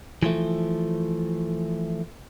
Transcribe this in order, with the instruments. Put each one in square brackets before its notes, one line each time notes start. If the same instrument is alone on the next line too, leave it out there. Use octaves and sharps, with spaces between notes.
[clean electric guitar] E3 F3 A3